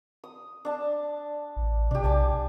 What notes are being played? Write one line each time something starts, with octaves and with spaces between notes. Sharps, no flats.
D#6
D4 A5
A1
C3 D4 G4
B1 G#5 A5 D6